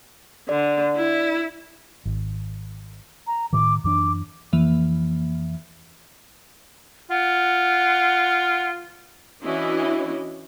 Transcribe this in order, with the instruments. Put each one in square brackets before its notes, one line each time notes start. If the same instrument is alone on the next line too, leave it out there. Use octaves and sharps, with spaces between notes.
[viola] D3 [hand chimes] D5
[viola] E4
[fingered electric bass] G#1
[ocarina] A#5
[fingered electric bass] A2 D#3 [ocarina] D6
[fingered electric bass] F#2 E3 D4 [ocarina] D6
[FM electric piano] F2 E3 A#3 E5
[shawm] F4 [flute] F#5
[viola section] E3 C#4 D4 E4 F#4 D#5